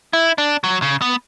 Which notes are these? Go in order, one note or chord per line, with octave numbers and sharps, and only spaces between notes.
E4
D4
F#3
C#3
B3